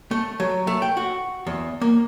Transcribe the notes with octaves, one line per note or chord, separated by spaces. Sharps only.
A3
F#3
A3
G5
F#4
E2
A#3